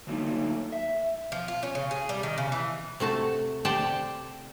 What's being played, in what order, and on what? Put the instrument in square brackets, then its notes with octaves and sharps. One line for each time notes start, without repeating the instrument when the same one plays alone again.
[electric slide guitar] D3 F#3 A3 A#3 D#4
E5
[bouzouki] F3
F4
C#4
C#3
G#4
G3
D#3
C#3
E3
[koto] C3 A3 F#4 A5
G4 C5 D5 F#5 G5 A5